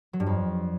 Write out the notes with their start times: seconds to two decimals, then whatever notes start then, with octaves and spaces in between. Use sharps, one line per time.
0.13 F#3
0.20 G2
0.26 F2